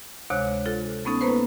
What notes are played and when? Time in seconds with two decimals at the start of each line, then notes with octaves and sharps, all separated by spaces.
0.30 D2 C3 G#3 C#5 D6 F#6
0.66 F4 A4
1.05 A3 B3 C#4 D#4 A4
1.21 A#3 B3 B4 C5